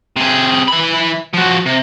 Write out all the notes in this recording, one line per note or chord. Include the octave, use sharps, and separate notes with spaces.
C3 G#4
E3 B5
F3 F#4
C3